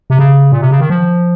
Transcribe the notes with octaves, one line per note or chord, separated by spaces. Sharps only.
C3
C#3
A#2
C3
C#3
D#3
F3